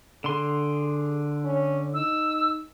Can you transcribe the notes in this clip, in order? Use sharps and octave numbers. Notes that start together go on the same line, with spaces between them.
D3 G#4 C6
C#4
D#4 E6